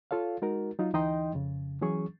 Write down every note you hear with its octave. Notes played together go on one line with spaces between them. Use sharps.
F4 A4 C#5 F5
G#3 D#4 F#4 A#4
F#3 D#4 F4
D2 E3 D#4 D#5 G5 C6
F2 C#3
E3 F#3 C#4 G#4 C#6